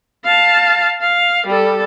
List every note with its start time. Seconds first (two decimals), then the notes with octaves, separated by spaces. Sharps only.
0.24 F5 A5
1.01 F5
1.47 G3 A4